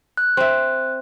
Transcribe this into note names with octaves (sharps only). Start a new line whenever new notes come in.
F#6
C4 E5